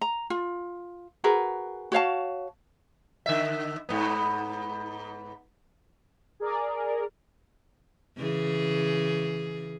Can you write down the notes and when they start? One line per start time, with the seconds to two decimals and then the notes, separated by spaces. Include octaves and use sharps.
0.01 A#5
0.30 F4
1.24 F#4 G#4 A#4 B4
1.92 F#4 C#5 F5 A5
3.26 D3 E5
3.89 G#2 B3
6.40 G#4 A#4 D5
8.17 C#3 E3 G#4